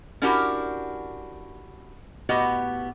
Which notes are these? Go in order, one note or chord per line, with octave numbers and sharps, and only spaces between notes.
C#4 D4 E4 F#4 G4 A#4
A2 B3 F#4 G4 D#5